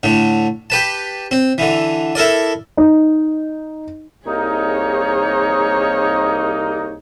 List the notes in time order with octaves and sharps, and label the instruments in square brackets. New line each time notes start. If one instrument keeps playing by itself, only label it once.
[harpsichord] A2 D3
G4 B4 A5
C4
D3 E3
E4 A4 A#4 D5
[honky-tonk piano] D#4
[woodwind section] C2 A#3 D#4 [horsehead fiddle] G#4 C#5